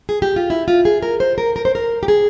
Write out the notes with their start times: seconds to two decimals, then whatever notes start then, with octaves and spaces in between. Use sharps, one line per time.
0.09 G#4
0.22 G4
0.36 F4
0.50 E4
0.68 F4
0.85 G#4
1.03 A#4
1.20 C5
1.38 A#4
1.56 A#4
1.65 C5
1.75 A#4
2.03 G4
2.08 G#4